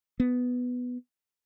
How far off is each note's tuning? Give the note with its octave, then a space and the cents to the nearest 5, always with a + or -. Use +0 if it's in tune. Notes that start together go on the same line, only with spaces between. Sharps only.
B3 +5